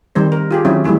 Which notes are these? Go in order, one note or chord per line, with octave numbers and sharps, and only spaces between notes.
D#3 G3 C4 C5
A#4
F4 G4 G#4
D#3 F#3 C4 C#4 E4
E3 G3 A3 E4 G#4